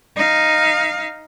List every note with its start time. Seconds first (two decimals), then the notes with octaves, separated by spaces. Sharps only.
0.16 D#4 F5